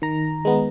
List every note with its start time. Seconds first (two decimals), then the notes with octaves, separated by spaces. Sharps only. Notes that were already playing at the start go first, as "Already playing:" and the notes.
0.02 D#3 A#5
0.45 G#3 B3